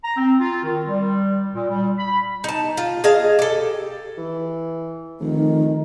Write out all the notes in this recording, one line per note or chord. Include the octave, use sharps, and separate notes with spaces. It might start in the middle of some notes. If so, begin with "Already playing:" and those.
A#5
C4
F4
D#3
G3
A#2
G3
B5
D#4 A5
F4
G#4 D#5 F5 A5
G4 A4
E3
F1 D#3